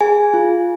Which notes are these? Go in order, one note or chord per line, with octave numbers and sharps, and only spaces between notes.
G#4 G#5
F4